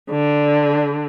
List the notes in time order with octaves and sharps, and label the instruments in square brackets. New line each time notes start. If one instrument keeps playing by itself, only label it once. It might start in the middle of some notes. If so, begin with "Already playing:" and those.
[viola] D3 [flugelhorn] D5